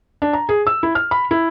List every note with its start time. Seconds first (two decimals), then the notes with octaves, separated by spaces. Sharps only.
0.22 D4
0.33 A#5
0.49 G#4
0.67 E6
0.83 E4
0.95 F6
1.11 B5
1.31 E4